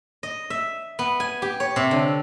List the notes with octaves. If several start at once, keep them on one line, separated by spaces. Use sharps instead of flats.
D#5
E5
B3
G#5
G4
C#5
C3
D3